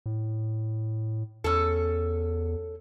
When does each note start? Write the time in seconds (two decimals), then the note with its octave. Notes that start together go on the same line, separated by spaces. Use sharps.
0.06 A2
1.44 E2 C#4 A4